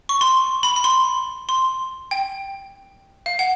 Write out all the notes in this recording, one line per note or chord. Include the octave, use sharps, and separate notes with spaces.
C#6
C6
B5
B5
C6
C6
G5
F5
F#5